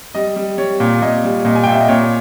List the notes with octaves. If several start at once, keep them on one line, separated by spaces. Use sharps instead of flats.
G3 D#5
G3
G3 C#5
A#2
A#2 D#5
G3
A#2 D#5
G#5
A#2 G5
E5
D#5
A#2 C#5